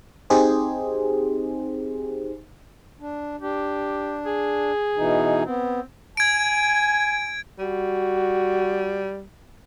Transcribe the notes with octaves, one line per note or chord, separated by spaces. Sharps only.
C4 D#4 G4 G#4 C5
D4
D4 G4
G#4
B2 E3 D#4
B3 C4
G#5 G#6 D7
G3 F#4